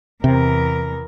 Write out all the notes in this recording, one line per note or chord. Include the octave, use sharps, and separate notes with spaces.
E2 C3 A#4